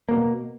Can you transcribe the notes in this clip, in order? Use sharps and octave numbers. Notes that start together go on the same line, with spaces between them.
B2 G3 A#3